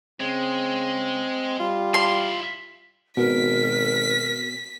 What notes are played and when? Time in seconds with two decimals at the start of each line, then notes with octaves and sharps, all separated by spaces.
0.21 C#3 G#3 C4
1.60 G3 F4
1.94 E4 F5 C6
3.17 G#1 B2 A#4 B6